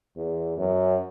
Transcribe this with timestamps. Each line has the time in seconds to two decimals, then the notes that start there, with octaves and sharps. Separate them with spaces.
0.16 E2
0.58 F#2